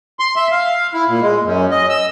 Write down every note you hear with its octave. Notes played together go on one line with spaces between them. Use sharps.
C6
E5
F5
E4
A#2
G#3
F#2
D#5
E6